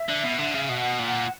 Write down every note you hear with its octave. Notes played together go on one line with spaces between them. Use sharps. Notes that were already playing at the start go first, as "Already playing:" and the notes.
Already playing: E5
D3
B2
D3
C#3
B2 F#5
A#2